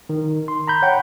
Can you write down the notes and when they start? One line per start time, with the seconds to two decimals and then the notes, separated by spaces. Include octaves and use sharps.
0.09 D#3
0.48 C6
0.68 A#5 B5 G6
0.82 C#5 F#5 G5 B5